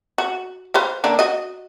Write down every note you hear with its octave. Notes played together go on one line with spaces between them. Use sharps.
F#4
B4 C5 F5
D3 A#3 D4
F#4 D#5